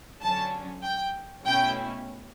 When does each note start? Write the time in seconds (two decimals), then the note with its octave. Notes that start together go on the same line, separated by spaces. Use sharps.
0.21 D3 F#3 C#4 A5
0.83 G5
1.45 B2 A3 C#4 E4 G5